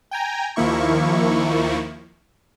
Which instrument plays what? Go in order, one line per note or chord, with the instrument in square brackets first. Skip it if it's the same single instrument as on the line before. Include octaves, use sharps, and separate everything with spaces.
[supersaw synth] G5 G#5 A#5
D#2 D#3 F3 A#3 E4 C#6